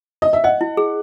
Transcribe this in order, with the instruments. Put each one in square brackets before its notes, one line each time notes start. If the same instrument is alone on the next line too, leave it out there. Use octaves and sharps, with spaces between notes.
[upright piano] D#5
E5
[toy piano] D#5 [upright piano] F#5
[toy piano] E4
G#4